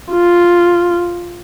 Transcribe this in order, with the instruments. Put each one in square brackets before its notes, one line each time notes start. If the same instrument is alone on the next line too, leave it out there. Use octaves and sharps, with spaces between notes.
[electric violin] F4